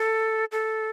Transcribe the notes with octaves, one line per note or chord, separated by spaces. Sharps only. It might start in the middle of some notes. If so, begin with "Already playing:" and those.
Already playing: A4
A4